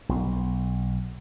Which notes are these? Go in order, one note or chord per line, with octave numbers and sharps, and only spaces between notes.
B1